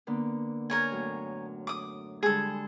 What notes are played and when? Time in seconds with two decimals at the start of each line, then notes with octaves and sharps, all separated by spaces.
0.07 D3 A#3 B3
0.70 A#4 C#5 G#5
0.92 F#2 A2
1.67 D6 D#6
2.23 D3 G3 G#3 G#4 A4